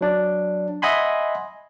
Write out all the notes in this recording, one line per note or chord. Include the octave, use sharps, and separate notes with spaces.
F#3 D4 D5
D#5 E5 F#5 G#5 B5 C6